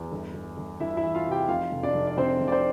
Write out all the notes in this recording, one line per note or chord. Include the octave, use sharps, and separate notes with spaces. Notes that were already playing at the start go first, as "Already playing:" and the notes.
Already playing: E2
G1
G1
G1
G1 E4 E5
E4 E5
E3
F4 F5
C3
G4 G5
F1 F4 F5
F1
D4 D5
F1
D5
D3 C4 C5
F1
D5
C4 C5